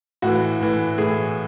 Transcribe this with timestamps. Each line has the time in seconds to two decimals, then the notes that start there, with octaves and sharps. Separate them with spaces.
0.22 A2 E3 F#4
0.60 A2 E3
0.98 A2 E3 G#4